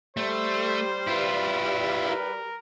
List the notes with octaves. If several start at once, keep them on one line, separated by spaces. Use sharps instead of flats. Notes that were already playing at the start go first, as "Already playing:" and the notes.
G3 A3 C5
E4 F4 B4
A#4